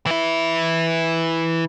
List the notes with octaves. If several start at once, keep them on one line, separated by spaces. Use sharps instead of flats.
E3 E4